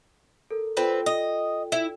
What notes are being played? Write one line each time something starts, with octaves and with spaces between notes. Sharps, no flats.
A4 A#4
C4 F4 A4 B4 G5
D#5
E4